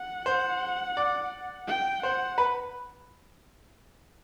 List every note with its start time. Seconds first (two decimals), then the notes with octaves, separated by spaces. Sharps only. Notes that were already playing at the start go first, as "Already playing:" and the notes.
Already playing: F#5
0.26 C5
0.97 D5
1.68 G5
2.03 C5 F#5
2.38 B4